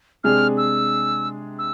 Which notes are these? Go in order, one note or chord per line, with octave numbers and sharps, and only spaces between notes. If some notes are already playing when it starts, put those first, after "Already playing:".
C3 G#3 D4 G#4 F6
E6
E6